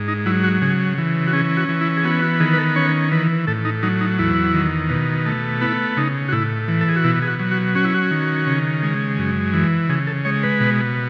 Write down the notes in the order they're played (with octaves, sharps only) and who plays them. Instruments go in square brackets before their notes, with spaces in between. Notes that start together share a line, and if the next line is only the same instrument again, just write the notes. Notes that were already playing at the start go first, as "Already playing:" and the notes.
Already playing: [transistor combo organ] G#2
D#4
F#3 E4
F#4
C#3 G#4
E3
F#4
C#4 G#4
F#4
E3
E4
G#4
B3 F#4
F#4
D#3 G#4
B4
A4
C#4 C#5
E3 B4
A2 A4
D#4
F#3 D#4
D#4
E2 E4
D#3
B2
A3
B3 E4
C#3 D#4
F#4
A2 E4
E3
A4
G#4
F#4
B2 E4
G#4
F#4
F#3
F#4
C#4 F#4
E4
F#4
D#3
C#3
G#3
F#2
E3
C#3 G#4
A4
G#3 C#5
B4
B2